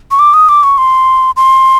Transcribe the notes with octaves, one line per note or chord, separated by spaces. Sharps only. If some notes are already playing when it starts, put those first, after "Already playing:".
C#6
D6
D#6
D6
C#6
C6
C6